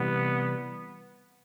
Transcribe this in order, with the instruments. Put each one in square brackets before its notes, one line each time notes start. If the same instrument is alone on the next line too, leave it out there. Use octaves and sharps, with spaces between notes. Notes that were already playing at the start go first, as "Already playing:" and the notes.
Already playing: [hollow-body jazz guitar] C3 E3 G3 [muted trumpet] B3